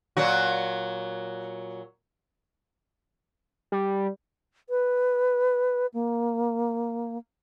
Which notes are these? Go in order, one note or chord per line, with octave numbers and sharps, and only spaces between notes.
A#2 F#3 F#4
G3
B4
A#3